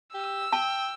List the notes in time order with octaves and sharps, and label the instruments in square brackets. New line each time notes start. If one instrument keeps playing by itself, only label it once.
[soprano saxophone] G4 [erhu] E6
[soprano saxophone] G5 [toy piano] A5